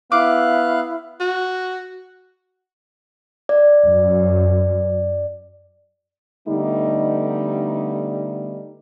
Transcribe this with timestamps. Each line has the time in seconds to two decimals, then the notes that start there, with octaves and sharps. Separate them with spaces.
0.12 B3 E4 F5 D6 F#6
1.20 F#4
3.49 D5
3.86 F#2
6.48 D3 G3 A3 B3 D#4